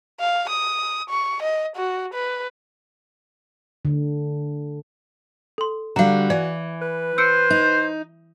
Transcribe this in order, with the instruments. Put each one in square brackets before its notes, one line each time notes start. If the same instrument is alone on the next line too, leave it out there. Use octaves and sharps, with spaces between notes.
[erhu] F5
D#6
C#6
D#5
F#4
B4
[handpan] D3
[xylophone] A4 C6
[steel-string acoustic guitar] D3 G3 [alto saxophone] F#4 [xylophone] F5 A#5
[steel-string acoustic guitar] E3 [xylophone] D5
[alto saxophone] B4
[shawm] C5 [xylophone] E6 C#7 D7
[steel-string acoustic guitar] D#4